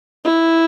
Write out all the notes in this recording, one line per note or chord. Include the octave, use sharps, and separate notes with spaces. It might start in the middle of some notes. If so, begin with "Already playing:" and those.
E4